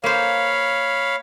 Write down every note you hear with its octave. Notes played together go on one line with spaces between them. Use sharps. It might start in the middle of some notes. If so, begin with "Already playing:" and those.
A#3 C5 C#5 F5 B5